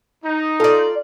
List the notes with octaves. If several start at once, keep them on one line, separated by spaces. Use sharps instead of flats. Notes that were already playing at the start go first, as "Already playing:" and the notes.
D#4
F4 A4 D5